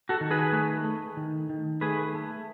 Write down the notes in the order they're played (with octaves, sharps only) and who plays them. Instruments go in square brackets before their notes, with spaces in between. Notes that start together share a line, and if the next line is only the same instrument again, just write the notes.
[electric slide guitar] F#4 A4
D#3
G#4 B4
A3
A3
D#3
D#3
A3 G#4 B4
A3